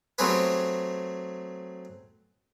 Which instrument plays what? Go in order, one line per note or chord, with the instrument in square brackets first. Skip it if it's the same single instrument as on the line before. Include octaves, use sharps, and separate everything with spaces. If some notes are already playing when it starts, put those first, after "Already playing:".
[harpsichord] F#3 A3 C4 G4 G#4 B4